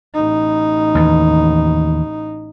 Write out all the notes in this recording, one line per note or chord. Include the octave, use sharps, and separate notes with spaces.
A1 D#4
D#2 E3